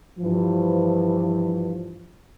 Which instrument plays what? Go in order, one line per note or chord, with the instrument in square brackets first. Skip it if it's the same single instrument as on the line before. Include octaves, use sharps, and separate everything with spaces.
[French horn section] G2 E3 F3